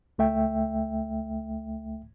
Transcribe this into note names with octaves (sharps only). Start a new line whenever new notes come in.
C#2 A3 E5 G5